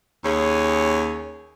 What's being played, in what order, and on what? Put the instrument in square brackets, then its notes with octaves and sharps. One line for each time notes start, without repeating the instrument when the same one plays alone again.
[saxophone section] D#2 C#4 G#4